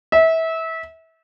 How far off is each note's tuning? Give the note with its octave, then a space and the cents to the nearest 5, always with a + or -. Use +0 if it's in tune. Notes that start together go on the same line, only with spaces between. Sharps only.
E5 -25